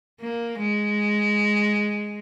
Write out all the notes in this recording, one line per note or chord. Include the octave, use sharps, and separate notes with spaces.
A#3
G#3